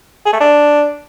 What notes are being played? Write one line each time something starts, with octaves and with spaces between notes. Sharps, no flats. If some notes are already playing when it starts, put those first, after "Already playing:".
G#4
A3
D4